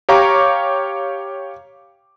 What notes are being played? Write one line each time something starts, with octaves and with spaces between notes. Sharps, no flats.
G4 C#5 F5 A#5 C#6 D6